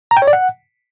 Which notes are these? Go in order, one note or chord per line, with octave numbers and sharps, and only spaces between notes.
A#5
G5
C#5
D5
F#5